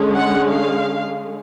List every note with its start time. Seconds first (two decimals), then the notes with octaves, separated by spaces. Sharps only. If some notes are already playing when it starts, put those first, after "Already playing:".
Already playing: D3 G#3 C#4
0.14 F#5
0.49 F5